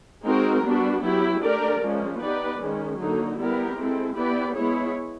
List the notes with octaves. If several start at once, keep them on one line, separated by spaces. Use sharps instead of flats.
G#3 C4 D#4 F#4 A#4
G3 B3 D4 F#4
F#3 B3 E4 G4
A3 D4 G4 A#4 D5
F3 G#3 C#4
B3 D#4 G4 B4 D5
D#3 G#3 C#4
D3 F#3 A#3 D#4
G3 B3 E4 G4 A#4
G#3 C4 E4 A4
B3 E4 G4 B4 D5
G#3 B3 E4 G#4 C#5